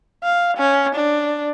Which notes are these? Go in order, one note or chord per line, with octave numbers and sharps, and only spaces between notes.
F5
C#4
D4